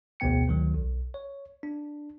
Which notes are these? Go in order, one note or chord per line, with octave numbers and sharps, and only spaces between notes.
A1 D2 B2 B3 G5 C#7
D2 D#3 F#3
B1
C#5
D4